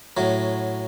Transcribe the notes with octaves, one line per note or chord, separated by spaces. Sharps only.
A2 F#3